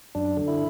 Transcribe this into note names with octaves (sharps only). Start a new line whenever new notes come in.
F#2 D4
D3
E4